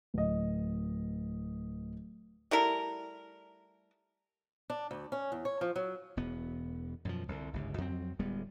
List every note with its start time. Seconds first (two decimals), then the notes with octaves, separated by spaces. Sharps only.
0.14 D1 D#5
2.51 G3 A3 E4 A#4
4.70 D4
4.91 D2
5.12 C#4
5.32 E2
5.45 C#5
5.61 F3
5.76 F#3
6.17 E1 B3
7.05 F#2 B2 F3
7.28 C2 D3
7.53 G1 C#2 G#2
7.78 F2 F#3 G3 C4
8.19 D1 G3 G#3 B3